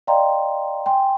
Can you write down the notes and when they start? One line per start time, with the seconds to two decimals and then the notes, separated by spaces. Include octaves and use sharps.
0.07 D5 D#5 F5 G5 A#5 C6
0.86 G5 G#5 C6